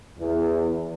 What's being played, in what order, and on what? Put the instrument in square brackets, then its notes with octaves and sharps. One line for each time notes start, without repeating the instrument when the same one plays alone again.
[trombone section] E2